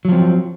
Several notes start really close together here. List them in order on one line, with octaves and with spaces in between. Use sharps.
F#3 F3 C4